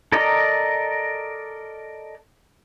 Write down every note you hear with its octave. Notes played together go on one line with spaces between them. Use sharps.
A4 A#4 D5 D#5 A#5